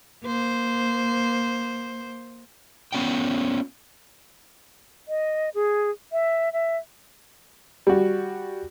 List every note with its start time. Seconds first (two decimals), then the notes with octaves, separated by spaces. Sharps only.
0.24 A#3 C5
2.93 B3 C#4 F4 G5
5.08 D#5
5.55 G#4
6.12 E5
6.53 E5
7.87 G3 F#4